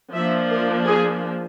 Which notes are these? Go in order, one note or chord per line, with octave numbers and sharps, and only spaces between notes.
F3 A#3 D4 E5
A#4
G#4